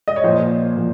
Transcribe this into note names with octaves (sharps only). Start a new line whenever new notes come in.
D#5
C#5
A#2 F3 C5
A#2 F3